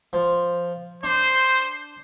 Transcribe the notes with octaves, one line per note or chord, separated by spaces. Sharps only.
F3
D4 C5